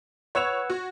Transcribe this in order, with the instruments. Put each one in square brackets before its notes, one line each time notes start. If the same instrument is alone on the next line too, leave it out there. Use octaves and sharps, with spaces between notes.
[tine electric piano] B4 F#5 E6 [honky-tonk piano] C#5 G#6 F7
[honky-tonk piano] F#4